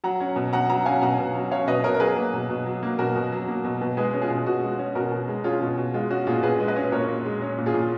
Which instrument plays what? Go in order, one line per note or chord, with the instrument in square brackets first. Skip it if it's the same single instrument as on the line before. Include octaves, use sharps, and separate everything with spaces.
[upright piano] F#3 F#5 A#5
C#4
B2
B2 F#5 A#5
F#3 F#5 A#5
C#4 F5 G#5
B2 F#5 A#5
B2
F#3
C#4 C#5 F5
B2 B4 D#5
B2 A#4 C#5
A#4
F#3 G#4 B4
A#3
B2
B2
F#3
A#3
B2 F#4 A#4
B2
F#3
A#3
B2
B2
G#3 G#4 B4
C#4
F4 G#4
B2
B2 F#4
G#3
C#4
B2 F#4 A#4
B2
G#3
C#4 F4 G#4
B2
B2
G#3 F4
C#4 F#4
A#2 F4 G#4
A#2 G#4 B4
G#3
B4 D#5
C#4
A#2 A#4 C#5
A#2
G#3
C#4
A#2
F4 G#4
A#2